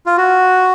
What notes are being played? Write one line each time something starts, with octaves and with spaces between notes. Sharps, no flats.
F4
F#4